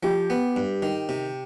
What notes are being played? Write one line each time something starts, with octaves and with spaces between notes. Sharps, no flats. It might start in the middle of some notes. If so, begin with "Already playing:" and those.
F3 G4
B3
G2
D#3
C3